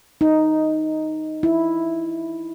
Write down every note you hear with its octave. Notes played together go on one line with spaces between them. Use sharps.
D#4
E4